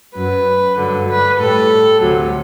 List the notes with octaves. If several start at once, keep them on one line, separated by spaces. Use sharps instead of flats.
F#2 F#3 B4
G2 D3 F#3
B4
A2 G3 A4
D2 C3 F#3